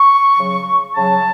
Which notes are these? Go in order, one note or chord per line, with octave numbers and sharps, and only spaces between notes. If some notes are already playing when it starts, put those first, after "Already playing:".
Already playing: C#6
C#3 F#3
C#3 F#3 A5